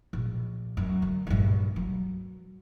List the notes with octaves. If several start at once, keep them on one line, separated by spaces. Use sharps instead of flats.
A#1
F#2
D3
A#1 G2
F#3